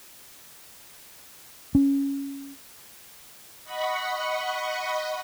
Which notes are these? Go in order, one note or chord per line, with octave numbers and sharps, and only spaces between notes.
C#4
D#5 F#5 B5 C#6